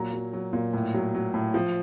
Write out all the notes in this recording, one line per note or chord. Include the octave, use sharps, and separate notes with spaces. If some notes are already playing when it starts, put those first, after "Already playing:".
Already playing: A#2 F#3 A#5
F#3
F#3
A#2
A2
F#3
F#3
A2
F3